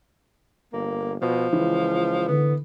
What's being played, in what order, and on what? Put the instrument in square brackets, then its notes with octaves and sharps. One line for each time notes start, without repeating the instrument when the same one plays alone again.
[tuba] G1 [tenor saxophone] A#3
[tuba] B2 [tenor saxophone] F3
[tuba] C#2 [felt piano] E3
[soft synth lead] D3 [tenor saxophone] B3